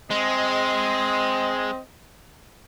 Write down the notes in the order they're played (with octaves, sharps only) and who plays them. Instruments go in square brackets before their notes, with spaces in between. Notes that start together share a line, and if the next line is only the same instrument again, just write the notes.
[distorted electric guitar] G#3 [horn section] C4 D#5